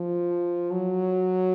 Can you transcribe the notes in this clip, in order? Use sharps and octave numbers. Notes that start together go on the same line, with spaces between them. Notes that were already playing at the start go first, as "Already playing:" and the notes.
Already playing: F3
F#3